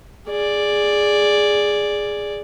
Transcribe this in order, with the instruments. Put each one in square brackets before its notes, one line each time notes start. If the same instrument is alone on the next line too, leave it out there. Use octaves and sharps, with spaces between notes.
[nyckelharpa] G#4 D5